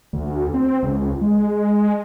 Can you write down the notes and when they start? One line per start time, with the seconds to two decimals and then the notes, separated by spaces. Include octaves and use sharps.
0.13 D2
0.54 C4
0.83 C#2
1.21 G#3